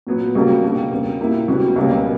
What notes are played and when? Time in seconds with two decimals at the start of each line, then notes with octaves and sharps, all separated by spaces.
0.07 A#2 F#3 B3
0.35 D2 C#3 G3 A#3
0.63 B2 A#3 D4 G4
0.91 E2 C#3 G3 A#3
1.20 A#2 A#3 E4 G4
1.48 D2 C#3 G3 B3 F#4
1.76 C#2 B2 G3 A#3 C#4